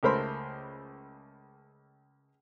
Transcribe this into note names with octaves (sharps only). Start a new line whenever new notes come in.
C#2 A3 A#4 C5 B5 C6